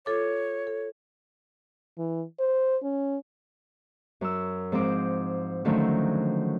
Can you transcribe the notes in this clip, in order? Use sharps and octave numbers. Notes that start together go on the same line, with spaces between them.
F4 A4 C#5 D6
A4
E3
C5
C#4
F#2 E6
G#2 F3 C4 D6
D3 D#3 F3 F#3 A3 C#4